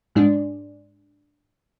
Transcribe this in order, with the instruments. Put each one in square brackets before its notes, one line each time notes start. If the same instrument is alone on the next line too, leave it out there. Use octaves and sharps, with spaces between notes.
[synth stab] G#2 G#3 D4